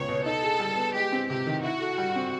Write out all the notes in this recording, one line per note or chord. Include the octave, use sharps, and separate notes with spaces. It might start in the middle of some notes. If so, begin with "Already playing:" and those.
Already playing: C#2 A#2 B3 C#5
B2
D#4 A4
G#4
G3
B3
G#3 G4
C4
C3 G4
D#3
E4 F#4
A4
G3
C4